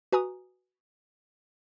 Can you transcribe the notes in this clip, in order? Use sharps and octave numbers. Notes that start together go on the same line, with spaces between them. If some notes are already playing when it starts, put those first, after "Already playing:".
F#4 B4 G#5 A#5 D#6